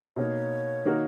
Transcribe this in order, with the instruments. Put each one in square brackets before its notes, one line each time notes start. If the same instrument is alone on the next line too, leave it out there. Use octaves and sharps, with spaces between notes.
[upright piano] B2 A#3 D#4 [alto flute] C#5
[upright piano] D#3 A#3 D#4 F#4 A#4